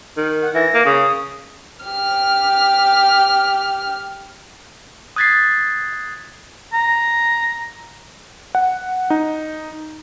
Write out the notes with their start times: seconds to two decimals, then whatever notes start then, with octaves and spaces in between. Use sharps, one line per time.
0.17 D#3
0.42 F#5
0.55 E3 A#6
0.74 A#3
0.86 C#3 D#6
1.85 G4 F6
5.16 D#6 F#6 G#6 A6 B6 C7
6.73 A#5
8.55 F#5
9.10 D#4